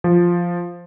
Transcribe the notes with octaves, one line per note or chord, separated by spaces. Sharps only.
F3